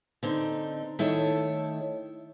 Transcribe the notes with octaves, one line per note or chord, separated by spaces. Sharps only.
D3 C4 D#4
D#3 A3 E4 A4 C#5